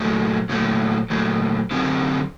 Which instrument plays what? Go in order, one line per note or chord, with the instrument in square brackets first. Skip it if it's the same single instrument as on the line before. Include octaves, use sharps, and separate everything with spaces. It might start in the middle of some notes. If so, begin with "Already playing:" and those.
Already playing: [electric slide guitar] A#2 F#3 A3
A#2 F#3 A3
A#2 F#3 A3
D3 F#3 C4 G4